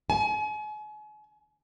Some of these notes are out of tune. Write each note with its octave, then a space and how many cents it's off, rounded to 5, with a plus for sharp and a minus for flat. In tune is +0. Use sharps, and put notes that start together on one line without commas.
G#5 +40